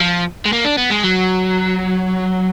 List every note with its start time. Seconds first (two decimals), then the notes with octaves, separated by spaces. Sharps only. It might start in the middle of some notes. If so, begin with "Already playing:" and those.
0.01 F3
0.46 G#3
0.53 A#3
0.65 D4
0.78 B3
0.90 G#3
1.03 F#3